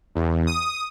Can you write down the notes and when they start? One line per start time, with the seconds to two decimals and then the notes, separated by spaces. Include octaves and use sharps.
0.15 E2
0.47 D#6